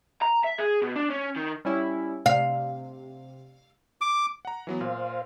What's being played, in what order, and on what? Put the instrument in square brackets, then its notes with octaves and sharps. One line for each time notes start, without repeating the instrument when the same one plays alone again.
[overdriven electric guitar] A#5
E5
G#4
B2
D4
C#4
D#3
[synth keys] G3 C#4 E4
[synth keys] C3 [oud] F5
[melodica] D6
[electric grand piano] F#5 A#5
E3 F#3 B3
[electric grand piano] A#2 [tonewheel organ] C5 F5